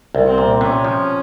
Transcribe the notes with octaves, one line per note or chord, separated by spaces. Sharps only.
C2
C4
A#2
C3 C#4
F3